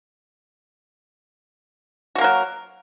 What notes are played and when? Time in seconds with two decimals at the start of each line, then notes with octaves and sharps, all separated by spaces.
2.15 F#4
2.18 A#3
2.21 A#4
2.24 F#3